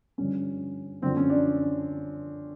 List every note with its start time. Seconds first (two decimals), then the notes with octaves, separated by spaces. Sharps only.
0.18 G2 D3 F3 C#4
1.02 F#2 D3 F3 C4
1.17 C#4
1.30 D4